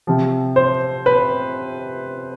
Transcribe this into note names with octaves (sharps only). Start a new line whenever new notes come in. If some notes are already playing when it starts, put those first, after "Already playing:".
C3 F3
C5
B4